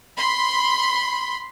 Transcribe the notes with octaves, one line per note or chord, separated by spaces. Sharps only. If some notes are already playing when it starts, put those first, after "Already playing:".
B5 C6